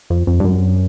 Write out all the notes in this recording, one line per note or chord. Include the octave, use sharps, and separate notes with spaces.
F2
F2
G2
F#2